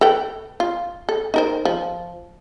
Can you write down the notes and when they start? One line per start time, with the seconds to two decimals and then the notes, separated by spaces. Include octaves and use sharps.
0.01 A4 B4 G5
0.60 F4
1.09 A4
1.34 D#4 A#4 C5
1.65 F3